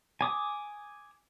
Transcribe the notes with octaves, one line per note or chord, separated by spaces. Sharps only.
G#5 D6 D#6